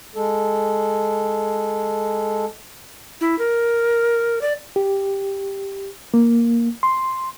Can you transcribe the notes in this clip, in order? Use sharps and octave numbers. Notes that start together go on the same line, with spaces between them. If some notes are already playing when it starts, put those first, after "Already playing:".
G#3 A4
E4
A#4
D5
G4
A#3
C6